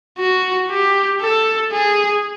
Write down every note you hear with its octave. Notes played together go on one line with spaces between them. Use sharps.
F#4
G4
A4
G#4